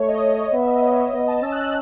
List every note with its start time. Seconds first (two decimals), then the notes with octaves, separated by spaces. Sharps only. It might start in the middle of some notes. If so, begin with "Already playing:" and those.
Already playing: A3 C#5
0.08 D#5
0.53 B3 E5
0.67 D#5
0.83 C#5
0.98 C#5
1.13 B3 D#5
1.28 A5
1.42 C#4 E6
1.52 F#6
1.63 F#6